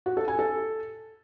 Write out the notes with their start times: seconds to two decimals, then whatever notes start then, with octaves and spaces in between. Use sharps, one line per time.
0.06 F#4
0.17 A4
0.28 G#5
0.39 A4